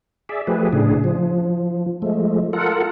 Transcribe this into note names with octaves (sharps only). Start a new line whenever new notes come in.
G#4 D5 E5
F3 A3 G4 G#4 B4
A2 C#3 D4 G#4
F3
F3 G#3 A3
F4 A4 A#4 F#5